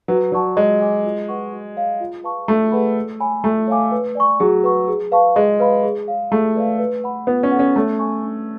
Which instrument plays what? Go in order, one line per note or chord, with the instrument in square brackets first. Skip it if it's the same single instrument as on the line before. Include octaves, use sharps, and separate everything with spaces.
[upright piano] F#3 [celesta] B4
[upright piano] F#3 [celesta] D5 F#5 A5 C#6
[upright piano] G#3 [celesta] C#5
[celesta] G#5 D6
F4
B4 F#5 C#6
F#4
C#5 F5
F4
B4 F5 A5 C#6
[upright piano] A3 [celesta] D4
[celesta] G#4 B4 F#5 B5
A4
C#5 G#5 B5
[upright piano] A3 [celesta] A4
[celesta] C#5 F5 G#5 D6
B4
D5 G#5 C#6
[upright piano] F#3 [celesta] G#4
[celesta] B4 F#5 C#6
G#4
B4 F5 A5 C#6
[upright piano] G#3 [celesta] G#4
[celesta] B4 F5 B5
G#4
C#5 F5
[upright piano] A3 [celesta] G#4
[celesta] B4 D5 F5
B4
F#5 B5
[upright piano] B3 [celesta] F4
[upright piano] C#4
[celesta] A4 C#5 F#5
[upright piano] C#4
[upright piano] A3 [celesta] C#5
[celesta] G#5 C#6
D4